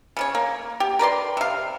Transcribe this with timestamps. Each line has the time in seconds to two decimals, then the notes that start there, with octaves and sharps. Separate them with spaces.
0.17 C#3 F4 C#5
0.35 A#3
0.80 G4
0.99 A#4 B4 D5 C6
1.37 C3 F5